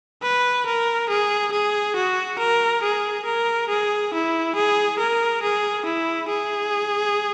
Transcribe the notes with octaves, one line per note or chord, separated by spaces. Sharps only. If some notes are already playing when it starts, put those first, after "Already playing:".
B4
A#4
G#4
G#4
F#4
A#4
G#4
A#4
G#4
E4
G#4
A#4
G#4
E4
G#4